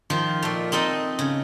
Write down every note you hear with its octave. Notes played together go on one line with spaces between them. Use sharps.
D#3 F3 F4
A#2 A3
C4 D#4 A4 D#5
C#3